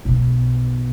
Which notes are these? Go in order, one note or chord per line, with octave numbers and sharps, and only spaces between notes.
B1 B2